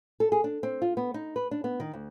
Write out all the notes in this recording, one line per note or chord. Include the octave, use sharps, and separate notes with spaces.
A4
G#4
D4
C4
F4
B3
D#4
B4
D4
B3
D#3
D2